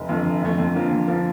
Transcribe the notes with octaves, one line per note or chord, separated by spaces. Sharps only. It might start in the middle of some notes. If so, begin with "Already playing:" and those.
Already playing: F1
F2 D3 A3
F1
F2 D3 A3
F2
D3 F3 A#3
F2
D3 F3 A#3